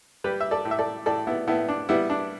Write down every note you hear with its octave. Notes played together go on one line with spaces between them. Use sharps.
G3 G4 B4
E5
A4 D5
A2
E5
A4 D5
A2 A4 D5
B3 E4
A2 B3 E4
D4
G3 B3 E4
D4